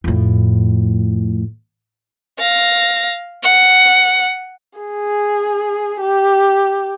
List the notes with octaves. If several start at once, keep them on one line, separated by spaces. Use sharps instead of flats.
F2 A2
F5 A#6
F#5
G#4
G4